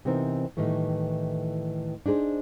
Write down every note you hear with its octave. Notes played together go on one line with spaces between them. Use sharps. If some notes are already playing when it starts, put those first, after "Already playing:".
C3 E3 B3 C4 D#4 A#4
A2 D#3 E3 G3 A3
D4 D#4 G#4 B4 C5